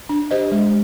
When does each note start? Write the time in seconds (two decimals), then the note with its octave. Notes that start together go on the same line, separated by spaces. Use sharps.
0.09 D4
0.31 G4 C5 D#5
0.52 G#3